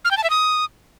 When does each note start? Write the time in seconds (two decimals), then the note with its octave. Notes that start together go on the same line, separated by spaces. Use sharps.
0.05 F6
0.11 G5
0.17 A5
0.24 E5
0.30 D#6